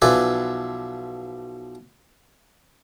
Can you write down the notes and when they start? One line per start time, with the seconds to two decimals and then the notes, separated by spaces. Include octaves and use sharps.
0.02 B1 F3 B4 D5 E5 G#5